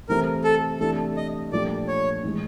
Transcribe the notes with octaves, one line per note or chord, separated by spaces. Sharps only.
C3 E3 A3 C4 E4 A#4
A4
C3 E3 A3 D4 A4
D#5
A#2 F3 A3 D4 G4 D5
C#5
A2 E3 G#3